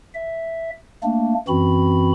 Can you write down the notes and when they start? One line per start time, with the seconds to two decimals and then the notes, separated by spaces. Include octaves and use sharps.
0.15 E5
1.04 A3 A#3 D4
1.48 F#2 E3 C4 F#4 B5